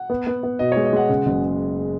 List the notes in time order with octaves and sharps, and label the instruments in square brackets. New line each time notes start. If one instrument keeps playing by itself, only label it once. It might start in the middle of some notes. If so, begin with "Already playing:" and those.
Already playing: [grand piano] F#5
[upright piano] B3
B3
B3
[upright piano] B2 [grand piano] D#5
[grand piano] C#5
[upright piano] G#3
[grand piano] D#5
[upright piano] G#3 [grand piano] F#5
[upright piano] C#3
F#1